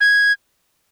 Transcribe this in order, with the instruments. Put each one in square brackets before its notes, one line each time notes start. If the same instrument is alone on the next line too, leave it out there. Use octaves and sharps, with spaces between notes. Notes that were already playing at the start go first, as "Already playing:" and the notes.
[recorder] G#6